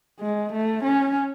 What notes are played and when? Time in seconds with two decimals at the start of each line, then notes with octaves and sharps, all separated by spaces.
0.20 G#3
0.52 A3
0.84 C#4